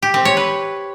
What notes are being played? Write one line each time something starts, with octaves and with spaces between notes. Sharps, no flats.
G4
C4
C#5
B4